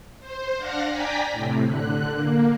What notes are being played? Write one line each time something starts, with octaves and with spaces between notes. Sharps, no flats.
C5
D4 F5 F#5 A#6
D5 G5 G#5 A#5 B6
A2 C3
D3 F#6
A#3